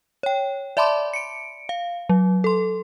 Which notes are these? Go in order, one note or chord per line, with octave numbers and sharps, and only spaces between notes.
C#5 G5
D5 E5 A5 B5 C6 D6
C#7 D7
F5
F#3
A4 C6